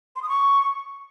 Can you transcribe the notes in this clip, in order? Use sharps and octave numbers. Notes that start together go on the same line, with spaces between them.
C6
D#6
C#6